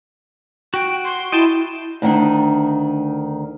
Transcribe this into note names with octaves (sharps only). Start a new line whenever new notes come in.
F#4 G5
C6
E4 D#5 G5 A5
D2 D#3 D4